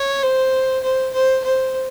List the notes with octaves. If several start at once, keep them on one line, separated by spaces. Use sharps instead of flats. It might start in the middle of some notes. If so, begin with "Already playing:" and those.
Already playing: C#5
C5
C5
C5
C5